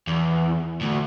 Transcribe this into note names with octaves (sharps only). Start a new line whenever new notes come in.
E2
D2